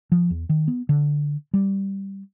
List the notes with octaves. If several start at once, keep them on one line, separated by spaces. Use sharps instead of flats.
F3
E2
D#3
B3
D3
G3